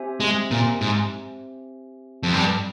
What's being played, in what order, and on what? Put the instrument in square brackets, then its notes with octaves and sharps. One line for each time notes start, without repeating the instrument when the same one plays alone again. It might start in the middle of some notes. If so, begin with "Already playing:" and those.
Already playing: [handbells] C4 G4 C5 E5 G#5
[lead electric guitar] G#3
A#2
G#2
F2
G2